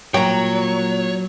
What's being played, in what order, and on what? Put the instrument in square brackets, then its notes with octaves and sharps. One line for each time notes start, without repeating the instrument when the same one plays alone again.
[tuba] A#2 [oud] F#3 [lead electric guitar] C#5 [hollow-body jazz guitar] G5 A#5